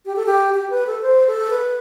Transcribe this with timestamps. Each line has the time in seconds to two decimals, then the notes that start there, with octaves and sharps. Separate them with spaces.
0.06 G4
0.16 A4
0.26 G4
0.54 G4
0.70 B4
0.87 A4
1.02 C5
1.27 A4
1.50 B4